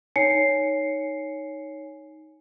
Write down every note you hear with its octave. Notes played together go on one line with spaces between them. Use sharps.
D#4 C#5 G#5 C7 C#7